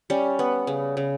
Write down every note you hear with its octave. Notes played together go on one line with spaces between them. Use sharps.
G3 C#4
B3
C#3
C#3